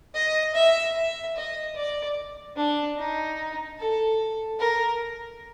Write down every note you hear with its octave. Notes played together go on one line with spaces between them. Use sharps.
D#5
E5
E5
D#5
D5
D4
D#4
A4
A#4